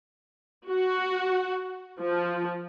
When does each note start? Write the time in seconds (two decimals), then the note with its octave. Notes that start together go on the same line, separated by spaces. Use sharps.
0.69 F#4
1.99 F3